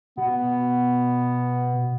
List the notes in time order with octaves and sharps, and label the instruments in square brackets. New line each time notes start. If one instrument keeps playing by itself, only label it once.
[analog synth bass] B2 [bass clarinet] B3